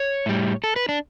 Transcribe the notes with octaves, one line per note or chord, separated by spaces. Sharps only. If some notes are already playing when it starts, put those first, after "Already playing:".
Already playing: C#5
A2 G3
A4
B4
D4